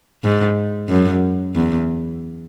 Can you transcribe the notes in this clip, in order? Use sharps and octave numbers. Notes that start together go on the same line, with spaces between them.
G#2
F#2
E2